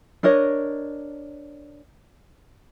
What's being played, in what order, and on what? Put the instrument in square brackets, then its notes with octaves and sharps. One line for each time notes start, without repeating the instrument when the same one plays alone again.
[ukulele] D4 A#4 C#5 D#5